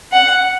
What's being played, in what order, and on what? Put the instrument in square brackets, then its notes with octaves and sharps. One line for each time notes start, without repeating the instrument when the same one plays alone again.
[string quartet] F#5